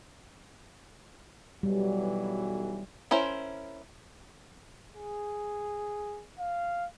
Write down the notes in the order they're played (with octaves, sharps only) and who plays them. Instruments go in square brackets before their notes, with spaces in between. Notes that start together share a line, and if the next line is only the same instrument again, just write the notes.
[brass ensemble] B1 E3 F#3 [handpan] G3
[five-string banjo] C#4 E4 A#4 C5
[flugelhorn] G#4
F5